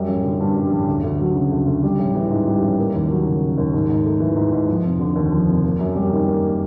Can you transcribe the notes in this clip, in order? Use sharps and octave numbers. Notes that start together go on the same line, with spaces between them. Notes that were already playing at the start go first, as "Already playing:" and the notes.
Already playing: F#2 G3
A1
D3
G2
G3
A1
D2
D2
F#3
C#3
D2
D2
G3
A1
E3
G#2
G3
A1
A#3
D#2
F#3
C#3
A#3
D#2
G#2
G#2
A3
E3
G#2
G#2
F3
F1
D3
D#2
F3
F1
A#3
F#2
G3
D#3
A#3